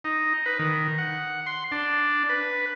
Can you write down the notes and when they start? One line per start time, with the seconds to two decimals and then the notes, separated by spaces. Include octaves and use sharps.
0.04 D#4
0.46 B4
0.59 D#3
0.98 F#5
1.46 C6
1.72 D4
2.29 B4